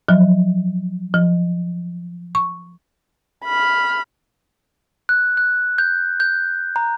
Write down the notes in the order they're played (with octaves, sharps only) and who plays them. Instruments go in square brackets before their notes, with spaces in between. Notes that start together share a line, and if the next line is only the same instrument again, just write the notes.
[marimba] F3 F#3
F3
C#6
[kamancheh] B5 F6
[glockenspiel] F#6
F#6
G6
G6
A#5